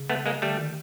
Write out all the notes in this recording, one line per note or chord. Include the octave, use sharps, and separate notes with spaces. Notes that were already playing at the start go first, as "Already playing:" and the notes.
Already playing: C#3
A3 B3
G#3 A#3
D3 G3 A3
D#3